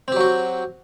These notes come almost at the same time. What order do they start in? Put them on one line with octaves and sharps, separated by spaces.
C4 G4 F#3 F#4